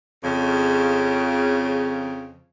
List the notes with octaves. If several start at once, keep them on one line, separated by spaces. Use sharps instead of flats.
F2 C#3